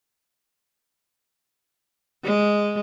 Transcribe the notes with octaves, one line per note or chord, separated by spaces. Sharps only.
G#3